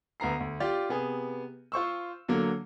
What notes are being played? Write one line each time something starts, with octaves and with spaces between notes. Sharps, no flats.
D2 B3 A#5 C7
D2
F4 G4 D5
C3 B3 G#4
F4 C5 C#6 E6
D3 F#3 A#3